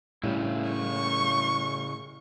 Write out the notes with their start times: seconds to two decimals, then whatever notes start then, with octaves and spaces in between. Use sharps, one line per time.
0.23 A2 C#3 G3 E4
0.70 C#6